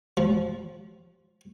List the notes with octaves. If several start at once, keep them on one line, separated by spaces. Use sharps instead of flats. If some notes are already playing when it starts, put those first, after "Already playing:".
F3